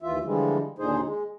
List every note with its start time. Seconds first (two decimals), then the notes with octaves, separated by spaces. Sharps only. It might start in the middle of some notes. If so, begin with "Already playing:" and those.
0.02 D#2 E3 F4 E5
0.24 D3 E3 F3 G3 G#3
0.79 D#2 A#2 D3 D#4 G#4 C5
1.03 G#3